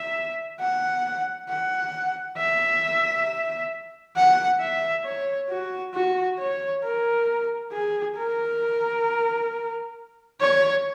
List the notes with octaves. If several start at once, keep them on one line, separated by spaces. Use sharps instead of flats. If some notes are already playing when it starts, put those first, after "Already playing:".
Already playing: E5
F#5
F#5
E5
F#5
E5
C#5
F#4
F#4
C#5
A#4
G#4
A#4
C#5